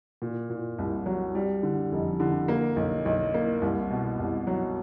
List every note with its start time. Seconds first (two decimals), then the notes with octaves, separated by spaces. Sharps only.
0.22 A#2
0.50 A#2
0.78 C2
1.06 F#3
1.35 G3
1.63 D3
1.92 F1
2.20 D3
2.48 A#3
2.76 B1
3.05 B1
3.34 A#3
3.62 C2
3.91 B2
4.19 C2
4.47 F#3